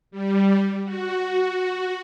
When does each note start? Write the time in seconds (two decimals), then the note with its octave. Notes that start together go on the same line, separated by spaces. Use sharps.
0.11 G3
0.84 F#4